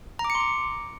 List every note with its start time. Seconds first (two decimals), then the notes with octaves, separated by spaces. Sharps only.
0.19 A#5
0.25 D6
0.30 C#7
0.35 C6
0.40 D6